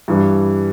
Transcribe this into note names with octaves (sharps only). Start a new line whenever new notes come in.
G2 E3 G3